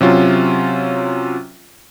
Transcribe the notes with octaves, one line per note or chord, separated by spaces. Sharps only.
C3 F#3 C#4 F4